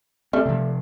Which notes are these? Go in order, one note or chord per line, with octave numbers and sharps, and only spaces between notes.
G3 A3 C4
C3 F3